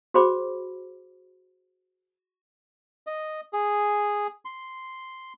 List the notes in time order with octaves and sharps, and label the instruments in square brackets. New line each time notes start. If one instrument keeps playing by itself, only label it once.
[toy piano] F#4 G#4 C5 B5 D6
[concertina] D#5
G#4
C6